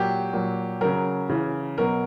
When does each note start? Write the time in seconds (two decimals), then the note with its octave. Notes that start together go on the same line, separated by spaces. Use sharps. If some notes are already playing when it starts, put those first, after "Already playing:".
Already playing: A#2 F#3 G4
0.33 A#2 F#3
0.81 C#3 F#3 A#4
1.29 C#3 E3
1.78 B2 F#3 A#4